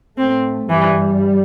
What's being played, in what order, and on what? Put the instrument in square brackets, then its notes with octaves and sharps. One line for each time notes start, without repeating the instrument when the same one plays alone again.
[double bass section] A2 A3 [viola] C4
[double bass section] G2 G3 [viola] E3